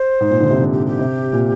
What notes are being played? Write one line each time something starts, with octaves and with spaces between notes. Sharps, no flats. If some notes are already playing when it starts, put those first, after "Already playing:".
Already playing: C5
G#2
A#2
D3
C3
D3
G4
G4
C3
A#2